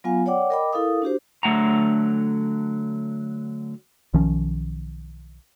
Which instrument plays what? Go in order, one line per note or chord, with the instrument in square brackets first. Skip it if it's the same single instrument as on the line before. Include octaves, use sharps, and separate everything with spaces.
[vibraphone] F#3 B3 F4 F5 G#5
C#5 D5 F#5 G5 D6
A#4 D#5 G5 B5 D6
E4 A4 A#4 F5 D#6
D4 F#4 G4 C5
[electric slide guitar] D3 F#3 A3 F#5 A#5
[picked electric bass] B1 D#3 F3 C#4